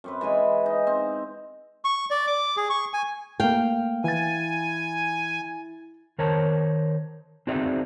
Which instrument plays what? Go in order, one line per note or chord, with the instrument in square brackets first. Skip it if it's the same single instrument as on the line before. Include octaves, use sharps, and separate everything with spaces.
[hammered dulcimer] F#2 C4 B4
E3 G#3 G#5 B5
D#4
C4
[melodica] C#6
D5
D6
G#4
C#6
G#5
[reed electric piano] A3 A#3 [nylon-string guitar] F5 G5
[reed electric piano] E3 [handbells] E4 A6 [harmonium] G#5
[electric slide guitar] D#3 A#4 C5 C#5 A5
C4 D#4 F#4 G#4 D5 E5